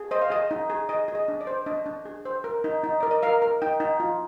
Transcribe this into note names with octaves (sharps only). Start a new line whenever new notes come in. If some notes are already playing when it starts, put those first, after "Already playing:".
Already playing: G#4
C5 D#5
F5
G#4 D#5
D#4
G#4
G#4 D#5
G#4
D#5
D4
D5
C5
D4 D#5
D4
G#4
C5
A#4
D#4
D#4
A#4 D5
D#5
A#4 F5
A#4
D#4 G5
D#4
F4